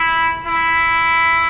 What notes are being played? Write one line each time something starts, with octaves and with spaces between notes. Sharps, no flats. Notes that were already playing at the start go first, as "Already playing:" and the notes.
Already playing: E4
E4